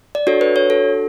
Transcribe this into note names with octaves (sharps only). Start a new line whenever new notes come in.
D5
D4 F#4 A4 C#5
B4
C#5
A4